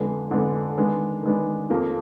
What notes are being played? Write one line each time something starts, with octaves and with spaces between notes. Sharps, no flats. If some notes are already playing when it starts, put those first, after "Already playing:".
Already playing: F2 D3 G#3 B3 D4
F2 D3 G#3 B3 D4
D#3 G#3 B3 D4
D#3 G#3 B3 D4
F2 F3 A#3